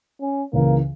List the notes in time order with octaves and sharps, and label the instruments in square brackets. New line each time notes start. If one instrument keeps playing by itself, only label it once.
[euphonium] C#4
[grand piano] C#2 C#3 E3 [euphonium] A#3